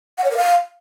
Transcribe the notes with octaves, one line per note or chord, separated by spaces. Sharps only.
F#5
C#5
A#4
F5